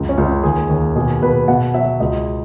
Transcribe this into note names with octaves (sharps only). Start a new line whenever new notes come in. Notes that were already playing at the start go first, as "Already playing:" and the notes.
Already playing: C#2 F#2
C#4
C#2
C#4
D#2 G#4
D#2
B2 G#4
B2 B4
B2 F#5
F#3 E5
C#2 D#5